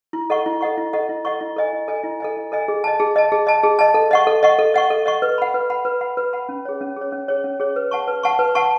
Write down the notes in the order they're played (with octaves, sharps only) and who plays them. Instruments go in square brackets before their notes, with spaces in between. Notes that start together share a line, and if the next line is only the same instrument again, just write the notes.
[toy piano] E4
A4 D#5 F#5 C#6
E4
A4 D#5 F#5 C#6
E4
A4 D#5 F#5 C#6
E4
A4 D#5 F#5 C#6
E4
A4 D#5 G#5
E4
A4 D#5 G#5
E4
A4 D#5 G#5
E4
A4 D#5 G#5
G#4
D#5 A5
G#4
D#5 A5
G#4
D#5 A5
G#4
D#5 A5
A4
D#5 F#5 C#6
A4
D#5 F#5 C#6
A4
D#5 F#5 C#6
A4
D#5 F#5 C#6
B4
F#5 B5
B4
F#5 B5
B4
F#5 B5
B4
F#5 B5
C#4
G#4 C#5
C#4
G#4 C#5
C#4
G#4 C#5
C#4
G#4 C#5
B4
F#5 A5 C#6
B4
F#5 A5 C#6
B4
F#5 A5 C#6